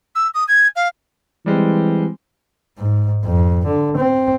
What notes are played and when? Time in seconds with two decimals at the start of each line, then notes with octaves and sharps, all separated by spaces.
0.15 E6
0.34 D#6
0.48 G#6
0.76 F5
1.46 E3 G3 G#3 C4
2.79 G#2
3.25 F2
3.66 D3
3.97 C4